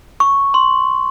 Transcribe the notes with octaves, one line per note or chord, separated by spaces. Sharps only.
C#6
C6